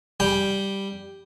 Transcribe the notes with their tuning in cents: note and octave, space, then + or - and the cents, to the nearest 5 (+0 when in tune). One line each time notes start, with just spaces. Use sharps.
G3 +0 G5 +0